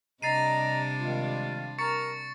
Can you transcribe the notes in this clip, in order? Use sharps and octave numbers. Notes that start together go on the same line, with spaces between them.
C3 G3 D4 D#5 A#5 A6 C7 D#7
D#3 G#3 F4
A#4 A#5 C#6 A6 C#7